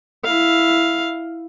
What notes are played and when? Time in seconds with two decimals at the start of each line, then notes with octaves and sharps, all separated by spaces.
0.24 E4 F5